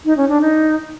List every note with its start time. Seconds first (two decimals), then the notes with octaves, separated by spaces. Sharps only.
0.05 D#4
0.17 C#4
0.29 D4
0.41 D#4